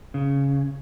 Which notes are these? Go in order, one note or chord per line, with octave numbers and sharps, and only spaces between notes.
C#3